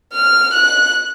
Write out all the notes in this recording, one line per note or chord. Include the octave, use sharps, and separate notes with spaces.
F6
F#6